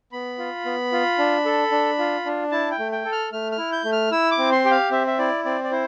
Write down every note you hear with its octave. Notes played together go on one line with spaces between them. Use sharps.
B3 B5
F4
B3
F4
D4
A4
D4
F4
D4
E4 A5
G5
A3
G5
A4
F6
A3 F6
F6
E4
G6
A3
F6
E4 E6
D6
C4
C6
G4 G5
F5
C4 E5
E5
E4 D5
C4 D5
D5
E4 C5